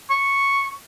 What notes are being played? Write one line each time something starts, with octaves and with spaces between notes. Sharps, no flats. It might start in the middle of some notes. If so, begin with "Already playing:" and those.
C#6